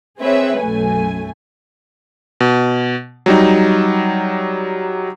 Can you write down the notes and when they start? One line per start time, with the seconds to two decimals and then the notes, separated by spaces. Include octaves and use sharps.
0.19 C4 G#4 B4 C#5 E5
0.59 B1 F#2 A3 G#5
2.40 B2
3.26 F#3 G3 D#4